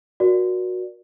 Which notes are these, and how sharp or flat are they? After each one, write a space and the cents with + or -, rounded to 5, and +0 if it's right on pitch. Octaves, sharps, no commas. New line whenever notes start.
F#4 -15 A#4 +35 D5 +10